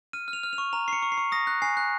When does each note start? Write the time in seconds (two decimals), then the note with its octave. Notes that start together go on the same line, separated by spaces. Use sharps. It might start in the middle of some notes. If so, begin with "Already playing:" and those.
0.13 F6 D#7
0.28 F6
0.33 F7
0.43 F6
0.53 F7
0.58 C#6
0.73 A#5 F7
0.88 C#6 C7
0.93 C#7
1.03 C#6
1.12 C7
1.18 C#6
1.32 D#6 A#6
1.47 F#6
1.62 G#5 C7
1.77 F#6